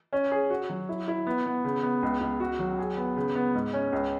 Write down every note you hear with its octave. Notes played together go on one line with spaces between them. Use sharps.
C#4
G#4
F#4
F#3
E4
E4
B3
B3
C#3
B3
C#2
C#2
F#4
F#3
G#4
B3
C#3
B3
G#2
C#4
C#2